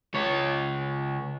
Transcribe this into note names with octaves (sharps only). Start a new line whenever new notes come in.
C#2 C#5